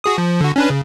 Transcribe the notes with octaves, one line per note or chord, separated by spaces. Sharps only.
F#4 G#4 D#6
F3
D3 F#4
C#4 D4 B4
C#3